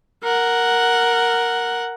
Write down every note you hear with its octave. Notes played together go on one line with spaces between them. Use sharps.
A#4 F#5